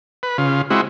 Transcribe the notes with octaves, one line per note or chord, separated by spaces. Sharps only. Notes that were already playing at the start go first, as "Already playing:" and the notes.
B4
C#3 F4
G#3 C4 E4 F#4